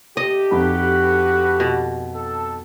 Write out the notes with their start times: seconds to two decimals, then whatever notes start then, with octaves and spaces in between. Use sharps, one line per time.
0.17 D3 A3 G4 D#5
0.51 F2 D#4 F#4 B4 B5
1.60 B2
2.15 A4